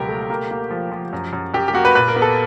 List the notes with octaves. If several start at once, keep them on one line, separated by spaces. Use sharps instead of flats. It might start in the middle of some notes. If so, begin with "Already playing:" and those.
Already playing: C#2 B2 F3 F#3 G4 A#4
A3
A#3
A#3
F3
F3
F#2
F#2
F#2 G4
G4
A#3 F#4
B4
A#2 B4
A#4
B3
A4